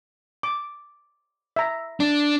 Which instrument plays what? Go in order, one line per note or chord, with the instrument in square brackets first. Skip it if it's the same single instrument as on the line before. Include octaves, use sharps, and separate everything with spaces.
[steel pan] D6
E5 A#5
[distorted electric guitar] D4